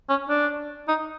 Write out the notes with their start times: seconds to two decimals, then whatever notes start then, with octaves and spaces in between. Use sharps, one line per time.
0.09 C#4
0.29 D4
0.88 D#4